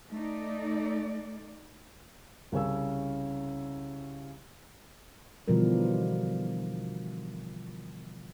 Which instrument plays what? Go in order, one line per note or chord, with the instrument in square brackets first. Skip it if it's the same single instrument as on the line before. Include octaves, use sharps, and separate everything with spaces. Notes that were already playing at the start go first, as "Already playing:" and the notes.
[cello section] A3 D#4 D5
[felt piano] C2 C#3 C#4 E6
[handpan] B2 D3 E3 F3 G3 A#4